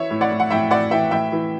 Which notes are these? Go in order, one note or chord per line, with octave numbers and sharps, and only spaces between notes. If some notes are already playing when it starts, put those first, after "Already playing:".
Already playing: E3 C#5 E5
A2
D5 F#5
A2
F#5
A2 E5 G5
A2 D5 F#5
E3 E5 G5
A2 E5 G5
E3